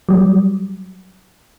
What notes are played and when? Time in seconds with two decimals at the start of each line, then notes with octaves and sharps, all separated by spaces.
0.09 F#3 G3